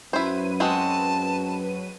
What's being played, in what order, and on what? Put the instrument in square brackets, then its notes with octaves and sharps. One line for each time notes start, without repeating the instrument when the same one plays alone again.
[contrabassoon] F#2 [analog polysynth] F#3 B4 D#7 [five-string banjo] E4 C5
[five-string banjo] G#3 C4 F#4 [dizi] A5